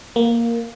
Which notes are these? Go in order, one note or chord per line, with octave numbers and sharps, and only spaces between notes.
A#3